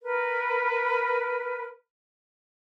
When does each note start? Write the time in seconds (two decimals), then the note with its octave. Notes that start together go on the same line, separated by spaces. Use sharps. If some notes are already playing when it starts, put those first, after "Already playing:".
0.01 A#4 B4